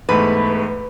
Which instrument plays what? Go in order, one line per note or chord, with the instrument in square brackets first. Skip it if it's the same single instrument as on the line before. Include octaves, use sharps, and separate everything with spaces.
[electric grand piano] E2 G#2 A3 [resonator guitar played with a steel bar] B4